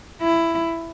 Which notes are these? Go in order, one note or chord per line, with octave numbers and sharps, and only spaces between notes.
E4